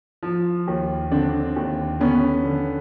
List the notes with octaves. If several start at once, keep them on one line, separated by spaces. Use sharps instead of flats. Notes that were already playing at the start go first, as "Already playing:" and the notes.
F3
D#2
D3 C4 D4
D#2
D3 B3 C#4
D3